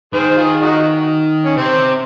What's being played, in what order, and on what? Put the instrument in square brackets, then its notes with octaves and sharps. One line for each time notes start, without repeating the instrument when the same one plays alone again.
[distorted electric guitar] D#3 [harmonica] G#4 C5
[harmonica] F4 G#4
D#4 F#4
C#4
[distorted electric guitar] C3 [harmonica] C4